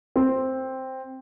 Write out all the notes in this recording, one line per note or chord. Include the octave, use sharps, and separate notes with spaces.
C4